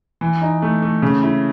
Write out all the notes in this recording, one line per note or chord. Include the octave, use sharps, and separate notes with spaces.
E3
D#4
A3
A3
C#3
E4